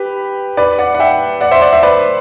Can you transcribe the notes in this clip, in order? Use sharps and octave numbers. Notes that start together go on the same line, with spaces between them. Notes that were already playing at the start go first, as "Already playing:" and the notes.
Already playing: G4 B4
B4 D5
D5 F#5
F#5
E5 G5
D5 F#5
C5 E5
D5 F#5
C5 E5
B4 D5